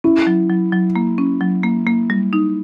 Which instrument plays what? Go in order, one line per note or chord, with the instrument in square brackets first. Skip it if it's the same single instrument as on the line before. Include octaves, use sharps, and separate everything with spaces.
[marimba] C#4 [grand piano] E4
[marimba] F#3
F#3
F#3
A#3
C#4
F#3
A#3
A#3
G3
D#4